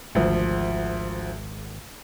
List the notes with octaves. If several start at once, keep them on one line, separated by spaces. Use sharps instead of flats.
G#1 D2 F3